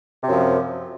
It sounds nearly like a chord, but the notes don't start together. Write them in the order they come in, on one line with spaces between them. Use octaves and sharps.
C3 F#2 F3